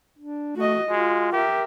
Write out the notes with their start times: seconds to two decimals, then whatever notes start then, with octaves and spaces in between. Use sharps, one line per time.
0.19 D4
0.57 A3 F#4 D#5
0.90 G#3 F4 F#4
1.32 G4 A#4 E5